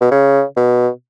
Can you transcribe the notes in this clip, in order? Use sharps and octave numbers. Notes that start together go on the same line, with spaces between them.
B2
C#3
B2